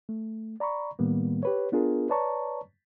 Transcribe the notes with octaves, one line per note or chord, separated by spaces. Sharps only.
A3
D5 A#5 B5 C#6
A2 D#3 G3 A#3 B3
G4 B4 C#5
B3 D4 F4 G#4 A#4
B4 C#5 D5 A5 A#5 C#6